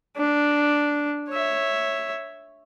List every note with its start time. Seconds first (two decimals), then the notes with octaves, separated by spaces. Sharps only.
0.17 D4
1.29 C#5 E5